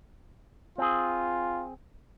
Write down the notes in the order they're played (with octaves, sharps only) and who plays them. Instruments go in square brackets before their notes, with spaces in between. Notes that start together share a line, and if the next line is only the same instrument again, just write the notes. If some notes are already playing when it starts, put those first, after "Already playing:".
[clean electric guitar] C4 G#4 [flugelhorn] F4